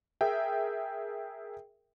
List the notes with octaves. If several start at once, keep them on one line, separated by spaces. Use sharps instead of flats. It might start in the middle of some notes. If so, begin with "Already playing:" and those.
G#4 A#4 E5 G5